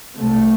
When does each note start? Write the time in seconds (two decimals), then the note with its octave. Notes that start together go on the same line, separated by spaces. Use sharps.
0.17 C2 C3 A3